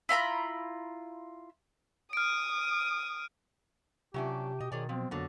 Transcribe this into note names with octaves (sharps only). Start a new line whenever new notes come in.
E4 F4 A#5 B5
D#6 F6 D7
C3 F#3 C#4 D4 F4 G4 E5
B2 D#5
B2 D#3 G#4 C#5 D5
F3 F#3 B3 C4 C5
F2 B2 D3 A#3 F#4 C#5